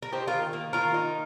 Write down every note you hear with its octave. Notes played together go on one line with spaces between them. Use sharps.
A#4
D#4 G4 C5
F4 A#4
D#3
A#3
D#3 F4 A#4
D#4